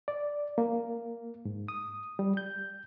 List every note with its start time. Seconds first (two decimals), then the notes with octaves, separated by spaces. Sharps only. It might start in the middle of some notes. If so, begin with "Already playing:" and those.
0.08 D5
0.58 A#3
1.45 G#2
1.68 D#6
2.19 G3
2.37 G6